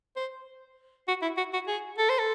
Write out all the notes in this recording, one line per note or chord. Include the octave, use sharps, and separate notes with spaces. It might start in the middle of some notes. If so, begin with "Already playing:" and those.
C5
F#4
E4
F#4
F#4
G#4
A4
C5
A4